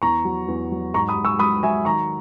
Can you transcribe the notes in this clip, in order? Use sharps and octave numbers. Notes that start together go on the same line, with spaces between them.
E2 A#5 C#6
F#3
E2
F#3
G#2 A#5 C#6
B5 D#6
G#2
C#6 E6
F#3 B5 D#6
F#3 E5 G#5
D#3 A#5 C#6